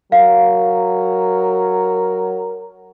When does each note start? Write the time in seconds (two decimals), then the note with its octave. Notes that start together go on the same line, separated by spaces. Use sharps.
0.12 F#3 A#4 F5